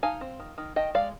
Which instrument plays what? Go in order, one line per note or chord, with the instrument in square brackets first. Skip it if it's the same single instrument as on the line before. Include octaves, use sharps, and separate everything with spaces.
[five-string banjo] D#4 F5 G#5
C4
D#3
D#3
D#3 D#5 G5
G#3 D5 F5